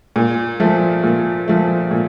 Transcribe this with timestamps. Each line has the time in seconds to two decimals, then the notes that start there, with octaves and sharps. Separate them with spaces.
0.16 A#2
0.60 F3 A3
1.03 A#2
1.48 F3 A3
1.91 A#2